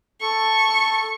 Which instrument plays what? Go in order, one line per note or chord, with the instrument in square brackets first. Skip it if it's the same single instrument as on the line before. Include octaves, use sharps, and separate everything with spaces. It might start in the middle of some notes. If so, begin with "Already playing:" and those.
[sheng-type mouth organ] A4 [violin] C#6